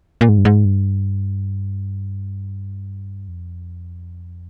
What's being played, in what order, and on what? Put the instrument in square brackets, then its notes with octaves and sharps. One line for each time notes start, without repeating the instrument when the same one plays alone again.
[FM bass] A#2
G#2
G2
G#2
G2
F2